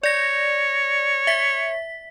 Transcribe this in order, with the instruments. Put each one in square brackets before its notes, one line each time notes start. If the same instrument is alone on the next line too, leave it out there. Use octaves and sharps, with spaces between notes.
[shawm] C#5 [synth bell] D5 A#6
[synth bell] E5 B6